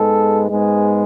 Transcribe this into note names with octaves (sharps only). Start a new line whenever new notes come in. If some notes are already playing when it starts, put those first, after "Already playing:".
Already playing: G#2 G#3 B3 A4
G#2 G#3 B3 G#4